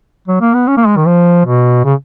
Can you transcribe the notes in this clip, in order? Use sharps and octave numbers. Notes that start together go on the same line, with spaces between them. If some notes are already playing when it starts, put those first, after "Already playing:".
F#3
A#3
B3
C#4
A#3
G#3
D#3
F3
B2
C#3